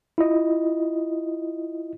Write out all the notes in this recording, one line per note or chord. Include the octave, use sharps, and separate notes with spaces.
E4 F4 D#5